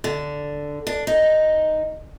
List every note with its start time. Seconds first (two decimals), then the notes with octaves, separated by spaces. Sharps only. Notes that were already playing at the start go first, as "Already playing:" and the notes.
0.04 D3
0.87 D4
1.07 D#4